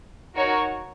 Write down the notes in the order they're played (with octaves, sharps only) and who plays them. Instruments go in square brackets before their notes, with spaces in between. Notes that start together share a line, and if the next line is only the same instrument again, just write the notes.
[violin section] D#4 F#4 A#4 C#5